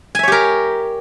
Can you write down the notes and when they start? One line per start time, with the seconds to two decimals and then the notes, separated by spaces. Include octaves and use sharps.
0.15 G#5
0.19 E5
0.23 C#5
0.28 G4
0.32 A#4